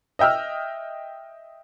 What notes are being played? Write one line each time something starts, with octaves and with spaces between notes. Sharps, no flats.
D#5 E5 G5 E6 F6